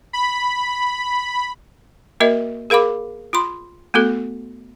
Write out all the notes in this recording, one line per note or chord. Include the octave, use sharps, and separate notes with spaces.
B5
A#3 F#4 A#4 D#5 E5
G#4 A#4 F5 B5 D6
F4 B5 C6
A3 B3 F#4 A4